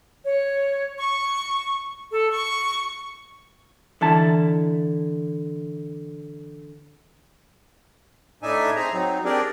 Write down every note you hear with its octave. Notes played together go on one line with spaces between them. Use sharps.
C#5
C#6
A4
C#6
D3 E3 E4 A5
A2 D4 D#4 E5 G#5
C4 G#4 A#5
F#3 C4 D#4
C4 D4 G4 G#4 A#4 D5